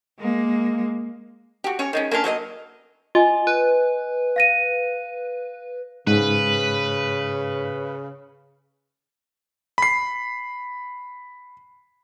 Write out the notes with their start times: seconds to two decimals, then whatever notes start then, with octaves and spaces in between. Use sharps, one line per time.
0.19 G#3 A#3
1.64 F#4 G4
1.79 C#4 C#5
1.93 D#3 G#3 C#4
2.11 A#3 C#4 D4 F4
2.24 F#3 A#3 C5 D#5
3.15 F4 D#5 G#5
3.47 B4
4.36 F5 A#6 D#7
6.07 G#2 C#3 B4
9.78 B5 C7